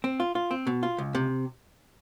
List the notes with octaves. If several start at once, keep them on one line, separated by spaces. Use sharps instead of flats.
C4
F4
F4
C4
B2
F4
C#2
C3